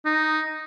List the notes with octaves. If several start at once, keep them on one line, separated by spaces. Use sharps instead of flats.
D#4